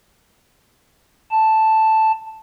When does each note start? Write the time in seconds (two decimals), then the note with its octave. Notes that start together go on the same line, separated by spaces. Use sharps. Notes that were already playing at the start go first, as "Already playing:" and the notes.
1.31 A5